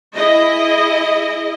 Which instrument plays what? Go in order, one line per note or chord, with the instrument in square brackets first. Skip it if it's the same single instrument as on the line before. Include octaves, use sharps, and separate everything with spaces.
[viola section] E4 G#4 D#5